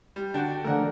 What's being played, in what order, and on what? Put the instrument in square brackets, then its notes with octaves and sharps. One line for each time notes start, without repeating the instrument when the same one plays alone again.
[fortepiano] G3
[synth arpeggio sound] D3 G5 [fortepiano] D4 F#4
[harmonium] D3 [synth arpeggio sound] D#3 F3 A3 [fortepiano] A#4 F#5